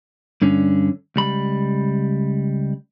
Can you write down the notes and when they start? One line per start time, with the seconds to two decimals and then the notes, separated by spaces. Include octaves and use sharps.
0.42 G2 D3 C#4
1.16 C#2 G3 B5